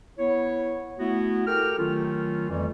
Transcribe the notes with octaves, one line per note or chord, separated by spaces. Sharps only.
B3 E4 C#5
A3 B3 E4 F#4
G4 A4 A#4 G5 F6
D#3 F#3 A3 C#4 F4
F2 E3 G3 A3